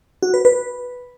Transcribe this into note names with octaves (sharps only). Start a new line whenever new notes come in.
F#4
B4
B4